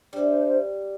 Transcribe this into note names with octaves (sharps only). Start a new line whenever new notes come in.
G3 D4 C5 E5